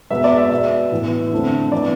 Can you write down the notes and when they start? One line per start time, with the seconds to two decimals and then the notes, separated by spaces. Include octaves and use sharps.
0.10 B2 G#3 B3 E5
0.24 D5
0.38 E5
0.51 B2 B3 E5
0.92 A2 E3 B3
1.31 D3 A3 C4
1.72 E3 B3 D5